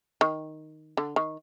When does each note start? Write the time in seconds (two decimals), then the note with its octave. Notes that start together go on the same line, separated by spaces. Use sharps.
0.21 D#3
0.97 D3
1.16 D#3